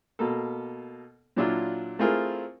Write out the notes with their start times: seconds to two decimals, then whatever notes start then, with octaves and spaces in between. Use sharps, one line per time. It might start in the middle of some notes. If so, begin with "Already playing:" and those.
0.19 B2 A#3 A4
1.36 A#2 F#3 D4 E4 F4
1.99 A3 C4 E4 F4 G#4 A#4